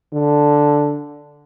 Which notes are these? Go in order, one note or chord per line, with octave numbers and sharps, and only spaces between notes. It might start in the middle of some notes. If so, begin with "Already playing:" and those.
D3